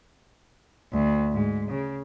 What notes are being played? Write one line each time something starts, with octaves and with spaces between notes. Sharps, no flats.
D2
G#2
C#3